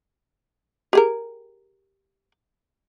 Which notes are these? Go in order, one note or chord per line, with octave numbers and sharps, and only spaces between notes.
G4 G#4 A#4